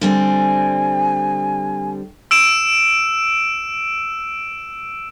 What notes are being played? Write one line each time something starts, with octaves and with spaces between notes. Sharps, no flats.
D3 G3 C4 G#5
E6 D7 E7